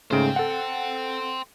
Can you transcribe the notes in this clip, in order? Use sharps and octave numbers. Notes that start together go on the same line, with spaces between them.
G#2 C#3 A3 C5 G5
A4 F#5